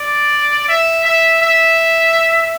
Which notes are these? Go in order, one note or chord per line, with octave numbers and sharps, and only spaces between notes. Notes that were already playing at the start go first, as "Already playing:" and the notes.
Already playing: D5
E5
E5
E5